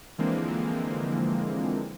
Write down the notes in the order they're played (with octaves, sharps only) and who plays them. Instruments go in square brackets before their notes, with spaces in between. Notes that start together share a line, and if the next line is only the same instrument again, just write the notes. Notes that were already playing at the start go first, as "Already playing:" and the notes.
[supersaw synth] D3 E3 F3 G#3 A#3 C4